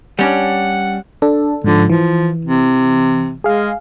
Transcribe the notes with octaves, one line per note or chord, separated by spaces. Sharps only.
G3 C#4 D4 F#5
D4 A4
G#2 D3 F3
E3 F3
C3
G#3 G#4 F5